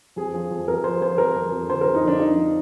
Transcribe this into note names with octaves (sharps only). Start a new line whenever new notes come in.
F2 G#4
F3
F2
F2 A#4
F3 C5
F3 C5
F2 A#4
F2
F2
D3 C5
A#4
F2
D#4
F3 D4
F2 D#4
F3